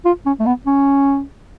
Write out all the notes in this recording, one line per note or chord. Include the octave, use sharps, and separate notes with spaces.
F4
C#4
A3
B3
C#4